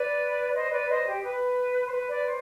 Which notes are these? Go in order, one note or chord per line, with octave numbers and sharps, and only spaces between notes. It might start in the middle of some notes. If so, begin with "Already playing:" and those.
Already playing: B4 D5
C5 D#5
B4 D5
C5 D#5
G4
B4
C5
B4
B4 D5
C5